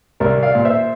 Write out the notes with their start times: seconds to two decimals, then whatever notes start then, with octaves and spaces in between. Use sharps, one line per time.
0.20 C2 A#4 D5
0.43 D5 F5
0.55 A#2
0.65 C5 E5